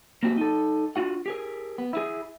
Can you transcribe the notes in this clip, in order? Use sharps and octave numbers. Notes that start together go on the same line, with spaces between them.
A#3 C4 F#4 G4
D#4 A4
D4 F4 F#4 F#5
G4 G#4 A#4
B3
E4 G#4